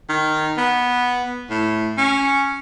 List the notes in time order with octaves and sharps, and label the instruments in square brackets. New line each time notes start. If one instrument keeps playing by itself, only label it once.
[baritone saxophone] D#3
B3
A2
C#4